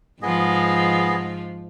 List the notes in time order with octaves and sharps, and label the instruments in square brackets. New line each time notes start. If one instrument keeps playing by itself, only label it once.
[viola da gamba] G#2 F3 [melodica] B3 G#4 D#5